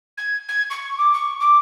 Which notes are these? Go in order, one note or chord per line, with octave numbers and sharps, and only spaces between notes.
G#6
G#6
C#6
D6
C#6
D6